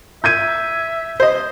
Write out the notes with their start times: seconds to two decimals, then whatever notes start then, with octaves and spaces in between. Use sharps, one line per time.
0.24 E5 G6 G#6 D#7
1.20 C5 D#5